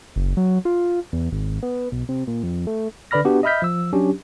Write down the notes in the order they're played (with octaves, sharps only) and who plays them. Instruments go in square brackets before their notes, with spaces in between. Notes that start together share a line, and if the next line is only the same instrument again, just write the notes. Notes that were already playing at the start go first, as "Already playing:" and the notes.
[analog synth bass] F#1
F#3
F4
E2
G#1
B3
B1
C3
A#2
F2
A3
[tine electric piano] D3 B4 D5 B5 F6 A#6
B3 D4 F#4 G4
D#5 E5 B5 F6 G6 B6
F3 E6
F#3 C#4 D4 G4